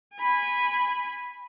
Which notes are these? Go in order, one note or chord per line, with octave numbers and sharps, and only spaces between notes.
G#5 B5